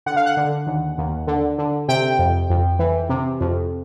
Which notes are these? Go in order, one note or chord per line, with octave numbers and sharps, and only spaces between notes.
D3 F#5
F5
F#5
D3
D#2
D#2
D3
D3
C3 G5
F2
F2
E3
C3
F2